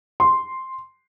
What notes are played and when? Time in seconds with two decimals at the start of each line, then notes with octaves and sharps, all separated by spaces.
0.20 C6